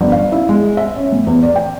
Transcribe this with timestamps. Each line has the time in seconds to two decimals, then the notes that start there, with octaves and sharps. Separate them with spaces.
0.01 G1
0.12 F5
0.32 E4
0.49 G#3
0.77 E5
0.95 C#4
1.12 A2
1.27 E2
1.43 D5
1.56 G5